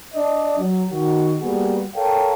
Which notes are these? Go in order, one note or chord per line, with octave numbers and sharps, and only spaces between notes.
D4 D5 D#5
F#3
D#3 F#4
G3 A#3 B3 F#4 G#4
A4 A#4 C#5 F5 G5